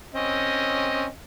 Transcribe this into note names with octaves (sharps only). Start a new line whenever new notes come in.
C4 C#4 D#5